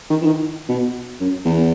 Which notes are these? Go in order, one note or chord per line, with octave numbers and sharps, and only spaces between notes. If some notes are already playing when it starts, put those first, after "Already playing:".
D#3
E3
D#3
B2
F#2
E2